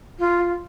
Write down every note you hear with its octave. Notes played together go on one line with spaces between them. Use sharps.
F4